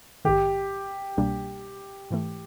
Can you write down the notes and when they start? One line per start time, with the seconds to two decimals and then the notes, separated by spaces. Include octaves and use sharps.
0.25 A#1 G#2 D#3 G4
1.17 C2 B2 G3 A#3 D4
2.11 G#2 E3 A3